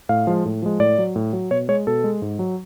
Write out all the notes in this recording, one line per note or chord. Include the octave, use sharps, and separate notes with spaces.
A2 F5
F3 G#3
A2
F3 G#3
A2 D5
F#3
A2
F#3
B2 C#5
G#3 C#5
B2 A4
G#3
G#2
F#3